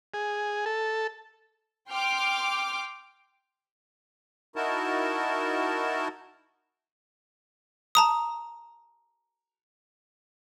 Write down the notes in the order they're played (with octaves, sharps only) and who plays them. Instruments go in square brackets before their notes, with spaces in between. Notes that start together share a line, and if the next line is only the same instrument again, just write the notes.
[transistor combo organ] G#4
A4
[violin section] G5 C6 D6 F6
[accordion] D#4 E4 F#4 A#4 A5
[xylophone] A5 A#5 D#6